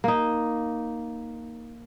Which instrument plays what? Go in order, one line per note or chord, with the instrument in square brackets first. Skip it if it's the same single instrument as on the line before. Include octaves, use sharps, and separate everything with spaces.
[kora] A#3 D#4